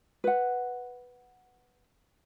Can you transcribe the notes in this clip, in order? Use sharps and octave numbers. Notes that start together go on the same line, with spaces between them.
B4 F#5